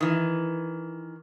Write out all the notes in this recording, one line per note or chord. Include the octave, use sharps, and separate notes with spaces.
D#3 E3